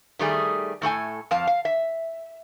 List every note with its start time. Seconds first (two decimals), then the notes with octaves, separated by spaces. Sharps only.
0.19 D#3 G3 A3 G#4
0.82 A2 A3 A4 G#5
1.31 F2 F5 A5
1.47 F5
1.65 E5